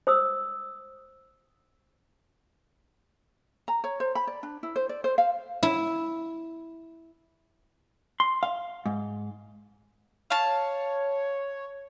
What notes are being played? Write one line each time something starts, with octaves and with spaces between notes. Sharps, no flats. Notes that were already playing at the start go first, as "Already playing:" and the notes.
C5 D#6 E6
A#5
C#5
C5
B5
D5
D4
E4
C5
D5
C5
F5
E4
C6
F5
G#2
C#5 F5 A5